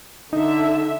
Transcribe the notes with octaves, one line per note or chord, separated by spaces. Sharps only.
D3 D#4 E5